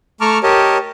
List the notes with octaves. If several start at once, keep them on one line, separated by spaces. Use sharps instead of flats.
A3 A5 A#5 C#6 D6 F6
G4 A#4 C#5 D#5 A5